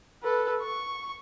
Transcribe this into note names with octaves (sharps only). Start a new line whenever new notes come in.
A4 B4
C#6